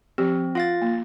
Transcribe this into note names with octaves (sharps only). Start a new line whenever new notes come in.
F3 C4 G4
F4 F5 F#5 A6
A#3